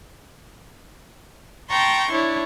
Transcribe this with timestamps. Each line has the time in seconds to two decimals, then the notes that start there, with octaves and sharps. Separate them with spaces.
1.69 G5 A5 A#5 C6 C#6
2.09 D4 E4 C#5